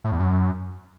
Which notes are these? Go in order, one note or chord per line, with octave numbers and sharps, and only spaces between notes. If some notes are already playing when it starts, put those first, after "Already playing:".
A2
E2
F#2